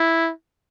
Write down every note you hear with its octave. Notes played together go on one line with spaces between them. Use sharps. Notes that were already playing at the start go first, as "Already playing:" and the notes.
Already playing: E4